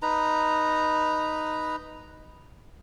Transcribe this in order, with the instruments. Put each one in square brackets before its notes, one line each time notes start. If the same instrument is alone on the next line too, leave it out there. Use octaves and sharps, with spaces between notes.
[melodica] D#4 B4 A#5